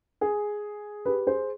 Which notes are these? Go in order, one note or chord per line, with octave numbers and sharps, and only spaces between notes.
G#4
G4 B4
G#4 C5